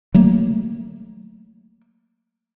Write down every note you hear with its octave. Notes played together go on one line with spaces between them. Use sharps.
F#3 A3 A#3